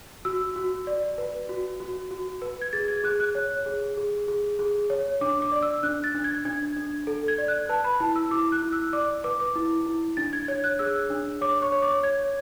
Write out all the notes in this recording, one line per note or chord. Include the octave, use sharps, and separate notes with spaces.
F#4 E6
F#4
D5
B4
F#4
F#4
F#4
B4
G#6
G#4 A6
G#6
G#4 F#6
F#6
C#5
G#4
G#4
G#4
G#4
C#5
D4 D6
D6
D5
E6
D4 F#6
A6
D4
G#6
D4 G#6
D4
A4
G#6
D5
F#6
B4 A5
B5
E4 A5
E6
E4 D6
F#6
E4
E6
D5 D6
B4 D6
D6
E4
E4
D4 A6
G#6
C#5 G#6
F#6
G#4 E6
D4
C#5 D6
C#6
C#5
D6
C#5 G#6